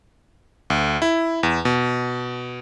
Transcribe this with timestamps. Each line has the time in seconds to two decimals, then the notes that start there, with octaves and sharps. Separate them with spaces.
0.70 D2
1.02 E4
1.43 E2
1.65 B2